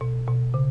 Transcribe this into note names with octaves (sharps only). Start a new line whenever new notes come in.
B2
B2
C#3